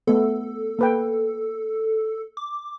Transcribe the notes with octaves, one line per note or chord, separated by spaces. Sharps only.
A3 B3 A4
A#3 B4 G5
D6